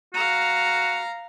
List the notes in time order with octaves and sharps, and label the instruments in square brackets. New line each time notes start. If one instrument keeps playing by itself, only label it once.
[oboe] F#4 [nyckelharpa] F5 A#5